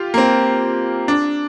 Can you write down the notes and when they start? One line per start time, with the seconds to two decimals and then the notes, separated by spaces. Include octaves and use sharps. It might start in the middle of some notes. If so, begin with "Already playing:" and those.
Already playing: F4 G4
0.14 A#3
0.18 C4
1.08 D4